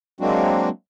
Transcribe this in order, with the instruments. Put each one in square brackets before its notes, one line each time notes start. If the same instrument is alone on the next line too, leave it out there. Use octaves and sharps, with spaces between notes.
[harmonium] F#3 G#3 A#3 C4 D4 F#4